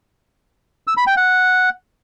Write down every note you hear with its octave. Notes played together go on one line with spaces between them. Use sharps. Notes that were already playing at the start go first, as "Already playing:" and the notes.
E6
B5
G5
F#5